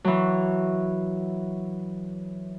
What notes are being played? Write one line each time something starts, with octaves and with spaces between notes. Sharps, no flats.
E3 F#3